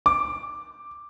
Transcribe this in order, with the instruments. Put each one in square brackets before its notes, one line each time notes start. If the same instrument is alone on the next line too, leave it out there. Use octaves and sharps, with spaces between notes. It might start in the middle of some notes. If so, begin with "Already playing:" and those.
[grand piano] D6